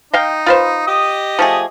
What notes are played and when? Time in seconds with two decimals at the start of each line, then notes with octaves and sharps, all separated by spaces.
0.13 D#4 D#5 F5 G5
0.46 F4 B4 C5
0.87 G4 D#5 D#6
1.39 F3 A3 G#4